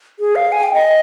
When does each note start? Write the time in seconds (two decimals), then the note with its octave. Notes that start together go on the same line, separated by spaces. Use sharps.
0.19 G#4
0.36 F5
0.52 G#5
0.63 G5
0.74 D#5